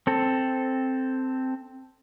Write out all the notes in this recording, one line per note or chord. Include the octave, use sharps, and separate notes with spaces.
C4 A4